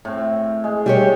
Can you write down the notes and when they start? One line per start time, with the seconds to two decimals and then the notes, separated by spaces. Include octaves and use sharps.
0.05 A2 C4
0.64 G#3
0.86 G3 G4 C#5